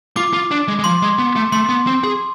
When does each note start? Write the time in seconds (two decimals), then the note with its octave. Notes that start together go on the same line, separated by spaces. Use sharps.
0.16 F4 D6
0.33 F4
0.51 D4
0.68 G#3
0.79 G#3
0.84 F3 C6
1.02 G#3
1.18 B3
1.36 A3
1.52 A3 C6
1.69 B3
1.87 C4
2.04 G#4